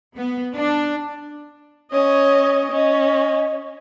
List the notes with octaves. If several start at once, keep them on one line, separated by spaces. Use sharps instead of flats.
B3
D4
C#4 C#5 D#5
C#4 D#5